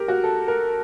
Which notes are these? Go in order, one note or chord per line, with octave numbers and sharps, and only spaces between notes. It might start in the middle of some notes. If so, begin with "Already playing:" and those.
Already playing: G4 A#4
F#4
A4
A#4